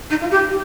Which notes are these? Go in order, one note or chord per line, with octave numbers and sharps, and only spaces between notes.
D#4
F4
G4